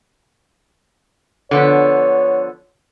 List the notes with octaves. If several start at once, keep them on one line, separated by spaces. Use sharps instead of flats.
D3 F3 B3 C#5